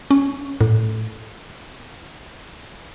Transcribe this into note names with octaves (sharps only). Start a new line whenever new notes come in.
C#4
A2